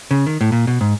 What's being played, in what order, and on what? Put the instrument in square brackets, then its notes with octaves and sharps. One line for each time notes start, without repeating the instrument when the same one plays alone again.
[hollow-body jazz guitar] C#3
D#3
A2
A#2
B2
G#2